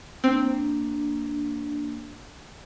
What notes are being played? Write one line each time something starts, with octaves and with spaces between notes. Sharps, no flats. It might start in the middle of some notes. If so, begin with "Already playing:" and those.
A#3 C4 D4